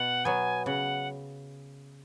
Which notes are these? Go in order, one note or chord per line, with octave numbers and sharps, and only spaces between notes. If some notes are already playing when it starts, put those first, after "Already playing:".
Already playing: B2 F#5
F#3 B3 G#5
C#3 F#5